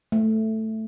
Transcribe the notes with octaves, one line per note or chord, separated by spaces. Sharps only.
A3